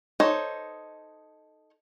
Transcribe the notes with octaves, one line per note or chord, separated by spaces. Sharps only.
D#4 A4 C5 C#5